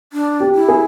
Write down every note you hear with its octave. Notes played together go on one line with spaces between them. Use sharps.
D4
G4
E4
G#4